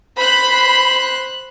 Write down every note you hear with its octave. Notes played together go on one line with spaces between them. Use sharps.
C5 B5 F#6